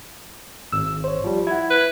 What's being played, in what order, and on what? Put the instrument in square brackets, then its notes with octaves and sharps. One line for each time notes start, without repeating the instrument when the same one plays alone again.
[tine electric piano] G#1 [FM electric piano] E6
[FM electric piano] C5 C#5
[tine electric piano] F3 G3
[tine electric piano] E4 [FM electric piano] F#5 G#6
[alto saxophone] B4